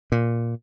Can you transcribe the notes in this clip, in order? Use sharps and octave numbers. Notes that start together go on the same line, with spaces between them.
A#2